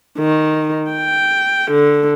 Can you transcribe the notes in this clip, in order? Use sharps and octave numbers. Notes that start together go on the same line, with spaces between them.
D#3
G5
D3